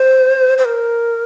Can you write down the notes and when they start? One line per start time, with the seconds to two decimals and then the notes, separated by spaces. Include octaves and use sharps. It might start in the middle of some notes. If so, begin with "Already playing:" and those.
Already playing: C5
0.58 C5
0.65 A#4